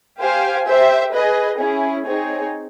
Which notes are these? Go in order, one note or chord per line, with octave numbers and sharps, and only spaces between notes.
G4 C5 F5 G#5
G4 C5 E5
G#4 B4 D#5
C#4 E4 G#4
C4 D#4 G#4 C#5